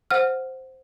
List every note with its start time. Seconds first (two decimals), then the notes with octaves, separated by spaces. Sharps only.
0.11 C5 F#5 F6